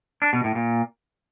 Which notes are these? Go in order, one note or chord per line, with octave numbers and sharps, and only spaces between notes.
D4
B2
A2
A#2